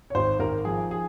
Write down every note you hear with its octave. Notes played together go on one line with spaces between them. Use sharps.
C#5
G#1 C5
G#1 A#4
F3 G#4
G#4